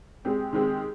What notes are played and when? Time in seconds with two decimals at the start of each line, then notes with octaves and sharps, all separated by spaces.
0.25 G#3 C4 G4
0.53 D#3 G#3 C4 G4